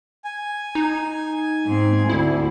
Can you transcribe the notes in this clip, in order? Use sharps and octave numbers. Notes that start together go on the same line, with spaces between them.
G#5
D#4
G#2 C4
D2 E4